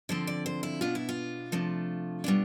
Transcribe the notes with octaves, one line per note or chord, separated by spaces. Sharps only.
D3 F3 C4 C5
D5
C5
E4
B2 B3 D4 F4
E4
F4
C3 F3 A3 D4
B2 G3 B3 D4